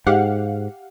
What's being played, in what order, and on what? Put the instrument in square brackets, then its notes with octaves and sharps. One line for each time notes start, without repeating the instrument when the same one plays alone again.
[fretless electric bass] G#2 [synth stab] G4 F5 F#5